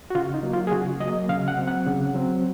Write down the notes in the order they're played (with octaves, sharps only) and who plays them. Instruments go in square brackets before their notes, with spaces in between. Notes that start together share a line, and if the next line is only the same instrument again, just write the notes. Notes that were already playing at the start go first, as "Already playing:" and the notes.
[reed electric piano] F#4
C#3 F4
D#4
F#3 A#3
F4
G#4
C#3 F#4
F#3 D#5
A#3
C#3 F5
F#5
F#3 C4
F#5
C#3
F#3 C4